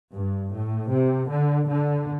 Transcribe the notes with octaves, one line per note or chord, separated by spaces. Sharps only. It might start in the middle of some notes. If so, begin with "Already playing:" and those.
G2
A2
C3
D3
D3